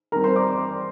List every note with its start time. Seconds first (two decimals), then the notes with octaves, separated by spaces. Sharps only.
0.12 D#3 G3 C4 A#4 A#5
0.24 C5 C6
0.36 D5 D6